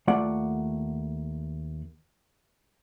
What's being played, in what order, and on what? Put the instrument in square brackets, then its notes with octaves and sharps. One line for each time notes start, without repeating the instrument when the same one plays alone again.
[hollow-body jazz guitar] D#2 A3 F4 D5 F#5